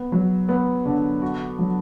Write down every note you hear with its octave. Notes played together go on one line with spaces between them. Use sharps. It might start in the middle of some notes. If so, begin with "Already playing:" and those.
Already playing: B3
F#3
B3
D3
F#4
F#3